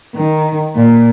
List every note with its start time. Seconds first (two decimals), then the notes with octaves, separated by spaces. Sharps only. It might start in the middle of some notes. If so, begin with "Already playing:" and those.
0.14 D#3
0.76 A#2